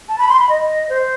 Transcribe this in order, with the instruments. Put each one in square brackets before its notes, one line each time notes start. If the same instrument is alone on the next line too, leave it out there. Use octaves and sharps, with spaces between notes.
[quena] A5
B5
C6
B5
D#5
C5